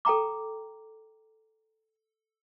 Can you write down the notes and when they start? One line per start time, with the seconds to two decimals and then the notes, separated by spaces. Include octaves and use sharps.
0.05 A4 G5 A#5 D6